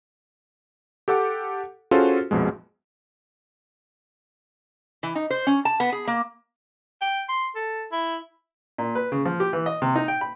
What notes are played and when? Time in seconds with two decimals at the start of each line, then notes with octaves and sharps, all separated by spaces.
1.08 G4 A4 F#5 D6
1.91 C#4 F4 F#4 G#4 A4 C5
2.31 A#1 F2 B2 G#3
5.03 E3
5.15 D#4
5.30 C5
5.47 C#4
5.65 A5
5.80 B3
5.92 G#4
6.07 A#3
7.01 G5
7.28 C6
7.55 A4
7.92 E4
8.78 A#2
8.95 B4
9.12 C#3
9.25 F3
9.40 G4
9.53 E3
9.66 D#5
9.82 C3
9.95 D#4
10.08 G5
10.21 B5